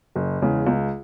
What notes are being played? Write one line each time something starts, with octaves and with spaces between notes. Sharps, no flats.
F#1
E2 C#3 G#3
C#2